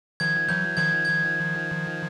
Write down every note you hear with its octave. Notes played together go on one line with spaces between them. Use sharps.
D#3 F3 G#6
E3 F#3 G6
D#3 F3 G#6
G#6